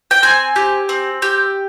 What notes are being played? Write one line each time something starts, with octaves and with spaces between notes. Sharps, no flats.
G5
C4 G#5
G4
C4
G4